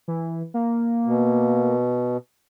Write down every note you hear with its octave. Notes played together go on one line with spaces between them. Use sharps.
E3
A#3
B2